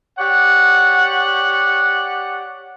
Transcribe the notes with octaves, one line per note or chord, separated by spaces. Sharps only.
G4 C#5 D5 F#5